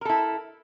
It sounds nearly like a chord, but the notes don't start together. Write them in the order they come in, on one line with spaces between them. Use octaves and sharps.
A#4 A4 E4